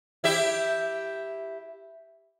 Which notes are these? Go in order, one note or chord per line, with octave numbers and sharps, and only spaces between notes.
E4 G4 E5